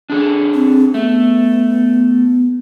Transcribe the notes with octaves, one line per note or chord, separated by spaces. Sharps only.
D4 G#4 A4
C4
A3 B3